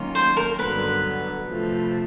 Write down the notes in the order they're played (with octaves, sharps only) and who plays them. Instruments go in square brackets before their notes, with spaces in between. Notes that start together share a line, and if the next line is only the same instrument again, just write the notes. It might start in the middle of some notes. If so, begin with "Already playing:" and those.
Already playing: [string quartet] D#3 F#3 A#3 C#4 F4
[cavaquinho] C5
A#4
[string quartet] G2 D3 F#3 B3 [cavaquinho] B4
[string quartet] C3 F3 A3